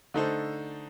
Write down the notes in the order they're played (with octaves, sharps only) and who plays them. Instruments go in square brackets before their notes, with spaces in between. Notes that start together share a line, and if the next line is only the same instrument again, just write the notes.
[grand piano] D3 A3 D#4 A4 C5